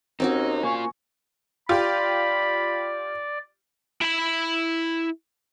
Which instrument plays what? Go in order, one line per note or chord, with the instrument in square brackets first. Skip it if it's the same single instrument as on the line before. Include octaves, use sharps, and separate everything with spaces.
[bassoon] D#2 [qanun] C4 C#4 F#4 [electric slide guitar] D#4
[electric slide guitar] A#3 F4 [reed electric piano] G#5 C#6
[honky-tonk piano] F4 G4 [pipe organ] D5 [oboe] B5
[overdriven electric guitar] E4 B5